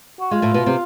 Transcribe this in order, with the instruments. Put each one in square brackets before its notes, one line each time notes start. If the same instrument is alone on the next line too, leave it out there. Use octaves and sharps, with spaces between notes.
[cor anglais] F#4
[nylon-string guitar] G#3 [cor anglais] F4
[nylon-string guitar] A2 A3
B2 B3
C3 C4